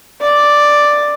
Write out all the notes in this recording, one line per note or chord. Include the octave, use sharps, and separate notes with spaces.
D5